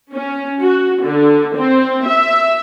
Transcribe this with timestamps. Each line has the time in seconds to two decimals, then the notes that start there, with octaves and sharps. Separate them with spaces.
0.12 C#4
0.60 F#4
1.03 D3
1.55 C4
2.05 E5